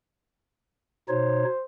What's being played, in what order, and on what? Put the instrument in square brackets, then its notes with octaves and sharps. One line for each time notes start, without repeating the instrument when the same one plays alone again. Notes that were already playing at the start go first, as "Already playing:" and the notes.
[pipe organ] B2 D#4 C#5 [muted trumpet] C5